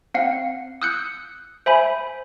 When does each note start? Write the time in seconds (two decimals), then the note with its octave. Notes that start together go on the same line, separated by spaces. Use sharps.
0.14 C4 F5 F#5
0.82 D#6 E6 F#6 G6 C#7
1.66 C5 E5 G#5 B5